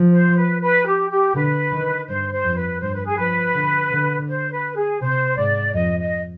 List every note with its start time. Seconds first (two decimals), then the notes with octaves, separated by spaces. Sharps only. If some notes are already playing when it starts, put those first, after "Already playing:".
Already playing: F3
0.12 C5
0.37 B4
0.62 B4
0.86 G4
1.10 G4
1.34 D3 B4
1.71 D#3
2.08 G2 C5
2.32 C5
2.44 F2
2.56 B4
2.81 G2 C5
2.93 B4
3.05 G#4
3.17 F3 B4
3.54 D3
3.90 D3
4.28 C5
4.52 B4
4.76 G#4
5.01 C3 C5
5.37 G#2 D5
5.73 F2 D#5
5.98 D#5